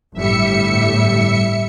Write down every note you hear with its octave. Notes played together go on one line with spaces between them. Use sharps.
G1 A2 G3 E5 C#7